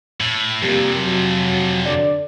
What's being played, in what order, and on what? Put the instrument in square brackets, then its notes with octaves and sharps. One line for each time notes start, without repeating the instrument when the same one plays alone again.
[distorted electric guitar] A2
[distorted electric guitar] F2 C3 [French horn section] G3 A#3 G4
[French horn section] F#3
D3 D5